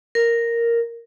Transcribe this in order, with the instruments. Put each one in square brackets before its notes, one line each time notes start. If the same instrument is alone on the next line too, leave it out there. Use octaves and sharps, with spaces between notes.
[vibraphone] A#4